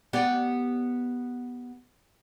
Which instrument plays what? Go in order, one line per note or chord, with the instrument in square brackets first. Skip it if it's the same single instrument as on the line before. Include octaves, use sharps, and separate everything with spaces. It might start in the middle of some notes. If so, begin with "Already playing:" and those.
[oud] B3 G4 D5